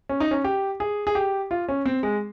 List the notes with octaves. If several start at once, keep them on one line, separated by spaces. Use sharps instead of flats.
C#4
D#4
C#4
G4
G#4
G#4
G4
F4
C#4
C4
G#3